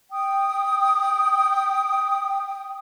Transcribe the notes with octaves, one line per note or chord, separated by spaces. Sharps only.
G5 D#6